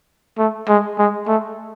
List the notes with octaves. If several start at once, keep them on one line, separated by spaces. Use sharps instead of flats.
A3
G#3
G#3
A3